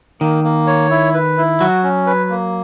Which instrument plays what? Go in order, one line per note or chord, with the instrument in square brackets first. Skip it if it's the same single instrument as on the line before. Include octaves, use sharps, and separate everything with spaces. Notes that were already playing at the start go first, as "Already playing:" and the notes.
[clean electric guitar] D#3 [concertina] A#3
[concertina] A#3
C#5
E4
B4
E4
[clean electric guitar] F#3 [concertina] F#4
[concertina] C#4
B4
A#3